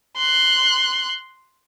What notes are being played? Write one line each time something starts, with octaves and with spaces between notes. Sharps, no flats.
C6 F#6